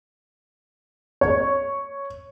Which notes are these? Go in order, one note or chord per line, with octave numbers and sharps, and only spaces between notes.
C#5